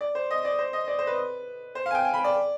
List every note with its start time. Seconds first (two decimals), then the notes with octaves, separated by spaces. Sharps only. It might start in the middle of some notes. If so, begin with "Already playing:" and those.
0.01 D5
0.15 C5
0.31 D#5
0.45 D5
0.59 C5
0.73 D#5
0.88 D5
0.99 C5
1.07 B4
1.75 C5
1.86 F5
1.91 G#5
1.95 G5
2.05 G#5
2.14 B5
2.24 D5